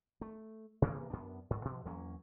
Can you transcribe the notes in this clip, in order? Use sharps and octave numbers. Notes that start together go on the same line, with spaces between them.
A3
C3 E3 A#3 B3
F#2 B3 D4
G#2
B2 F3
E2 F#3 A#3 C#4